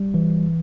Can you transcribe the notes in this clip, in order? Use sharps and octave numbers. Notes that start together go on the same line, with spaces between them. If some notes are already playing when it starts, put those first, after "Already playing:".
Already playing: G3
E3